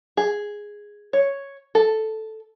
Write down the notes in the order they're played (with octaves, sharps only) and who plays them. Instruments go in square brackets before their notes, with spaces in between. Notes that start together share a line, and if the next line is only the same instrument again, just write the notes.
[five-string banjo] G#4
C#5
A4